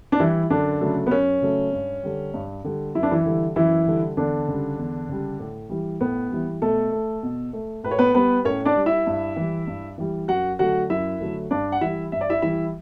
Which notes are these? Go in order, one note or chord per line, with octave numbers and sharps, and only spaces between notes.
D4
E3 G3 E4
F#2 D3 D4
C#3 F#3 A3
B3
F#2 C#4
C#3 F#3 A3
G2
D3 G3
G2
D3 G3
F#2 E4
D4
E3 E4
D3 G3
F#2 E3 E4
D3 G3
E2 D3 D4
C#3 G3
E2
C#3 G3
A2
E3 G3
A2 B3
E3 G3
B2 A3 A4
A3
B2
A3
A2 B4
C#5
B3 B4
G3 B3 B4
A2 C#4 C#5
D4 D5
G3
E4 E5
G2
E3 G3
G2
E3 G3
F#2 F#4 F#5
D3 F#3 A3 F#4 F#5
F#2 E4 E5
D3 F#3 A3
G2 D4 D5
F#5
E3 G3 E4 E5
G2 E5
D5
E4 E5
E3 G3 E4 E5